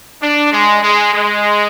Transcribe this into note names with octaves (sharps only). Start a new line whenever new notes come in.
D4
G#3
G#3
G#3